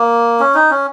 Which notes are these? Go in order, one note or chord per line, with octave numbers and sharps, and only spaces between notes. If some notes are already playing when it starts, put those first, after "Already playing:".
Already playing: A#3
C#4
D#4
C#4